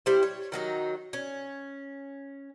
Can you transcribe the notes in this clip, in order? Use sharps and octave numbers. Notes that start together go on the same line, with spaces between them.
G3 E4 C5
C#5
D#3 F#3 D#4
C#4